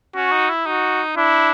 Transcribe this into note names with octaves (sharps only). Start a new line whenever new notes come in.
C#4 F#4
D#4
E4
D#4 F#4
D4 E4